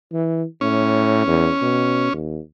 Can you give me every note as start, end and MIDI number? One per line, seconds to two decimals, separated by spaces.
0.13 0.44 52
0.61 1.24 45
0.61 2.13 61
1.27 1.50 40
1.62 2.10 47
2.13 2.39 39